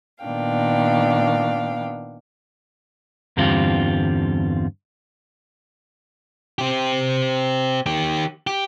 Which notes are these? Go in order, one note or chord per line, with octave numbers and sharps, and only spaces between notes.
A#2 D#3 B3 D4 F5 G5
E2 G2 D3 G3 C4 F4
C4 G4
D#3 G4
G4